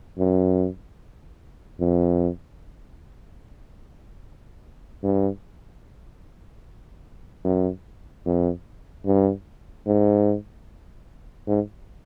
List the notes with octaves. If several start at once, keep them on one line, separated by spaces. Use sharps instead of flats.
F#2
F2
G2
F#2
F2
G2
G#2
G#2